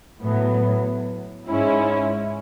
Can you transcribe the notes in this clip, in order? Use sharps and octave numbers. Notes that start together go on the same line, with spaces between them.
A2 F#3 B3
G#2 G#3 C#4 E4